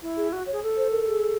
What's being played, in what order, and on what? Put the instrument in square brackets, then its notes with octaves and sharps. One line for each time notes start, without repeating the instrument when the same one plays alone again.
[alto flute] E4
[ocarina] G#4
[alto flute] F#4
[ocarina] C#5
[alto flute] G#4
A4
[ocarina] C5
A#4
G#4